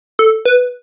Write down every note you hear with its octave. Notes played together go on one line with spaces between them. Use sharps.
A4
B4